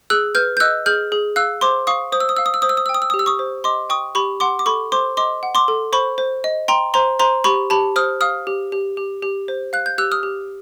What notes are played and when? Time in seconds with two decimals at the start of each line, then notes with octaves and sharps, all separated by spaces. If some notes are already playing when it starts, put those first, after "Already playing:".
0.10 G#4 E6 F#6
0.35 B4 F6 G6
0.57 G6
0.60 D#5 E6 F#6
0.86 G#4 F6 G6
1.12 G#4
1.36 F5 E6 F#6
1.61 C5 C6 D6
1.87 F5 C#6 D#6
2.12 C5 D#6
2.20 E6
2.29 D#6
2.37 F5 E6
2.46 D#6
2.54 E6
2.62 C5 D#6
2.69 E6
2.77 D#6
2.86 E6
2.89 G5
2.94 D#6
3.02 E6
3.10 D#6
3.14 G4
3.19 E6
3.26 C#6 D#6
3.39 C5
3.64 D#5 C6 D6
3.89 G5 C#6 D#6
4.15 G4 B5 C#6
4.40 F#5 C6 D6
4.59 D6
4.66 A4 B5 C#6
4.92 C5 C6 D6
5.17 D#5 C6 D6
5.43 F#5
5.55 C6 D6
5.68 A4
5.93 C5 B5 C#6
6.18 C5
6.44 D#5
6.68 G5 A#5 C6
6.94 C5 A#5 C6
7.19 C5 A#5 C6
7.44 G4 B5 C#6
7.70 G4 A5 B5
7.96 C5 D#6 F6
8.21 F5 D#6 F6
8.47 G4
8.72 G4
8.97 G4
9.23 G4
9.48 C5
9.73 F5 F#6
9.86 G6
9.98 G4 E6 F#6
10.11 D#6 F6
10.23 G4